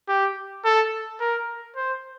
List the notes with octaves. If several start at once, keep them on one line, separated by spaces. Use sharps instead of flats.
G4
A4
A#4
C5